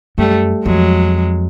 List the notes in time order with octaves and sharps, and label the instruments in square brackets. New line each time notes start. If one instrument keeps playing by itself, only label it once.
[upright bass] F#2 [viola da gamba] G3 A3
[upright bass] F2 [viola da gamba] F#3 G#3